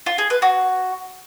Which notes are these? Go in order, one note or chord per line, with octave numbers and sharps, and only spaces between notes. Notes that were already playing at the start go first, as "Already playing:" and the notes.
F4
G#4
B4
F#4